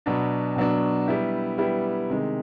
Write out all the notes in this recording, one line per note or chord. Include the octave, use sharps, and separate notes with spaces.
B2 F#3 B3 D4
B2 F#3 B3 D4
G3 B3 E4 G4
G3 B3 E4 G4
C3 D#3 G#3